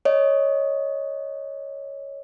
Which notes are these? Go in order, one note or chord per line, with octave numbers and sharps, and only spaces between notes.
C#5 D#5